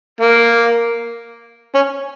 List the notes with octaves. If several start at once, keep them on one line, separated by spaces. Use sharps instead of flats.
A#3
C#4